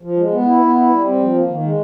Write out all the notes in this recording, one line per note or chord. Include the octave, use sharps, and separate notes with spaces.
F3
G#3
B3
E4
B3
E4
G3
C4
F3
A#3
D#3
G#3